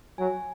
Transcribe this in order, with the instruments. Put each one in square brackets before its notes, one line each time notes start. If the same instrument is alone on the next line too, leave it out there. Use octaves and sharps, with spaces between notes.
[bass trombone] F#3 [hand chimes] G#5